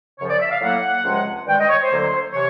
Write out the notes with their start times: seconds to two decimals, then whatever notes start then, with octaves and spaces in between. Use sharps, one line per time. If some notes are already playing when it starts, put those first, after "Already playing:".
0.19 F#2 C#3 F3 C#5
0.29 D5
0.40 E5
0.50 F5
0.61 A2 F#3 A#3 F#5
1.05 C#2 C3 F3 G#3
1.47 G2 D#3 G#3 G5
1.58 D#5
1.69 C#5
1.80 C5
1.90 D2 D3 F#3 A#3
2.33 C3 E3 C#5